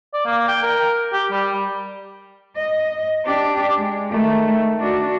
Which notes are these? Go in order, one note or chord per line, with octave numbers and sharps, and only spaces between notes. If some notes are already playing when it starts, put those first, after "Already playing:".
D5
A#3
G5
A#4
G4
G3
D#5
D4 G4
G#3
D#3 A3
D4 F#4